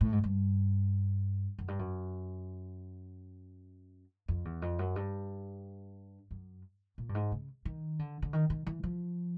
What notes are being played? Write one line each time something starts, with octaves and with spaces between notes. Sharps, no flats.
A2
G#2
G2
F#2
G2
F#2
F2
E2
F2
F#2
G2
F#2
A#2
G2
G#2
C#3
D#3
D3
D3
D#3
D#3
E3
F3